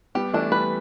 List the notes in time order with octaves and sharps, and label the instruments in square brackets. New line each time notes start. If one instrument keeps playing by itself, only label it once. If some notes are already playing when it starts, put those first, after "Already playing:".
[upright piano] G3 B3 [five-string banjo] G4
[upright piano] E3 A3 [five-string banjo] D4
[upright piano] G3 B3 [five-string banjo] B4